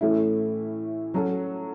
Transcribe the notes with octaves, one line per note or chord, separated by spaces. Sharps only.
A2 E3 A3 C#4 E4
F#3 C#4 F#4 A4